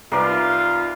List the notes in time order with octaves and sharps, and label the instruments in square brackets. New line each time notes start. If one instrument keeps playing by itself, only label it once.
[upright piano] C2 [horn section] D#4 F4 [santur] A#4 B4 D5